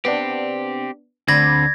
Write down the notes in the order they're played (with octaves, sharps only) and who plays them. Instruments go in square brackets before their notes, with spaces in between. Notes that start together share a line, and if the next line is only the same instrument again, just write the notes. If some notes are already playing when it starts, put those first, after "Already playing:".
[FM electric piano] B3 D4 [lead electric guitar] C4 G4
[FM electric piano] D2 D5 B5 [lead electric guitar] D3 C4 [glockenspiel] G#6 A#6